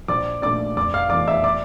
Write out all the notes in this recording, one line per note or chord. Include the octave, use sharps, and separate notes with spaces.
A#1 D5 D6
A#2 A3 D4 D5 D6
F1 D5 D6
F5 F6
E2 E3 A3 D5 D6
E5 E6
D5 D6